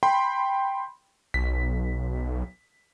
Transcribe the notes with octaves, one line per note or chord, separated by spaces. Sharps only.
G5 B5 C6
B1 B6